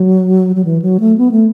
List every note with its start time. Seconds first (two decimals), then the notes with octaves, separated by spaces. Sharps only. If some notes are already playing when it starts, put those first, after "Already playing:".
Already playing: F#3
0.56 F#3
0.65 E3
0.82 F#3
1.00 A3
1.18 B3
1.31 A3